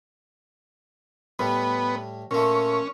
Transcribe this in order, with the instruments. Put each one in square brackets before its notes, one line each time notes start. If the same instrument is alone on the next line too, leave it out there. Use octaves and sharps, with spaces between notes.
[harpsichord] A2 G3 [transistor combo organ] B3
[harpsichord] A#2 A3 [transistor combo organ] C#4